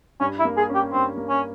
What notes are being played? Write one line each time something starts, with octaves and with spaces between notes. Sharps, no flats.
G2 C#4
E4
A#3
G#4
C#4
G4
G2 C4
A#3
C#4